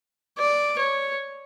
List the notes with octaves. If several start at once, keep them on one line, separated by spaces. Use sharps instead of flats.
D5
C#5